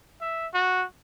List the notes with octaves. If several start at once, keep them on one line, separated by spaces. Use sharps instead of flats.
E5
F#4